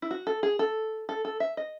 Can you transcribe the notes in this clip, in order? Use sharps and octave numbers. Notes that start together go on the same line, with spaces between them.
E4
F#4
A4
G#4
A4
A4
A4
E5
D#5